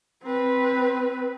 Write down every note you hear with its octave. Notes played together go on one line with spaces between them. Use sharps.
C4 B4